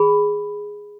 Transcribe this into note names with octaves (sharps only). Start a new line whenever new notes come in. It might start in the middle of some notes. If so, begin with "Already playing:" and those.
Already playing: G#4 B5